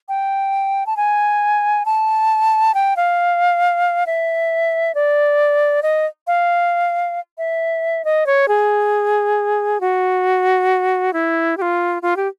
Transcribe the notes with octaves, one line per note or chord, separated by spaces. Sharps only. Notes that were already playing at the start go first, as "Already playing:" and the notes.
G5
A5
G#5
A5
G5
F5
E5
D5
D#5
F5
E5
D#5
C#5
G#4
F#4
E4
G4
F4
F4
G4